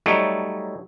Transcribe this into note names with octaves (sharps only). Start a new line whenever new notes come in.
F#3 G3 A3 D#4 A4 C#5